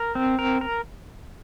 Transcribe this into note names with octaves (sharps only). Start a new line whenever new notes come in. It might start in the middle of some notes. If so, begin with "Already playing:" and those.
Already playing: A#4
C4
A#4
A#4